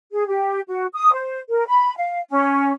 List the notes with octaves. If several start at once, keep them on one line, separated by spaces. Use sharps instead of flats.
G#4
G4
F#4
D#6
C5
A#4
B5
F5
C#4